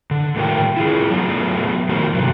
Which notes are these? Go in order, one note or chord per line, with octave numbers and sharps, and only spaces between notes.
D3
A2 D#3 G3 F#4 A#4 G5
E4 F4 G#4
F#3 A3 B3 F4 G#4
D#3 A3 F4 F#4 A#4 C5
G2 C3 F#3